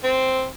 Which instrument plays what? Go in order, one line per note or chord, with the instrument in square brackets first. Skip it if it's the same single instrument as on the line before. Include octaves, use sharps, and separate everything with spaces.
[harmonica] C4